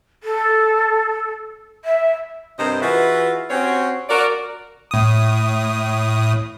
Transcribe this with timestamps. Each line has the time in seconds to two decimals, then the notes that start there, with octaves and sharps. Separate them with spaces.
0.23 A4
1.85 E5
2.59 G2 C3 A#4 C5 D#5
2.82 E3 F4 F#4 G#4 B4 E5
3.50 C4 C#4 F#4 G4 C5 C#5
4.10 F#4 A#4 D5
4.91 A2 D#6